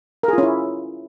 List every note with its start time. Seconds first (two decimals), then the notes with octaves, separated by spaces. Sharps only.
0.23 A#4
0.28 G#4
0.33 F4
0.38 C#4
0.43 E4